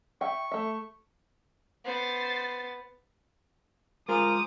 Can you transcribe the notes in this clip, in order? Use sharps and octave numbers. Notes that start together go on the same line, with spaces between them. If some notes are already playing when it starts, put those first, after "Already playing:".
E5 G5 C#6
A3 E5
B3 C5 A6
G#3 F4 G#4 A#4 C5 D6 D#6